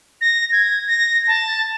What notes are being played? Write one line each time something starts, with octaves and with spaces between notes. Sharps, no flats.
A#6
G#6
A#6
A5